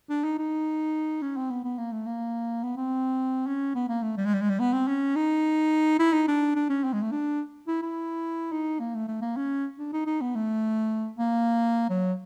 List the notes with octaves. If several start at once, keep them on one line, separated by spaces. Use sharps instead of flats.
D4
D#4
D#4
C#4
C4
B3
B3
A#3
A3
A#3
B3
C4
C#4
B3
A#3
A3
G3
G#3
G3
G#3
G3
B3
C4
C#4
D#4
E4
D#4
D4
D4
C#4
C4
G#3
A3
D4
E4
E4
D#4
A#3
A3
A3
A#3
C#4
D4
D#4
D#4
B3
A3
A#3
F#3